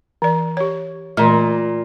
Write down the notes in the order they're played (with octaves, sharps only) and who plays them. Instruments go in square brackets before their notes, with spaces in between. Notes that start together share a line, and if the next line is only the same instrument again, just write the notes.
[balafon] E3 D5
G4 C#5
[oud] A#2 [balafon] E3 A3